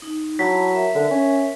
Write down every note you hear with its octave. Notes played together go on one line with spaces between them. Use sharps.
D#4
F#3 E4 A5 B5 B6
A#4 E5
D3
C#4